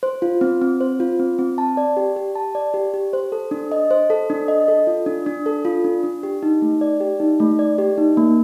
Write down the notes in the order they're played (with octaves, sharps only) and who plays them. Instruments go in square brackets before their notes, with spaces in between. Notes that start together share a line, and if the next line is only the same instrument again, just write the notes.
[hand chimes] C5
F4
C4
C4
C5
F4
C4
C4
A5
D5
G4
G4
A5
D5
G4
G4
C5
A4
D4
D#5
C5
A4
D4
D#5
A4
F4
D4
D4
A4
F4
D4
D4
G4
D#4
A3
D5
G4
D#4
A3
D5
G4
D#4
A#3